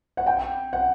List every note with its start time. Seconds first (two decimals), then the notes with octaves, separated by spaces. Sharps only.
0.17 F#5
0.27 G5
0.73 F#5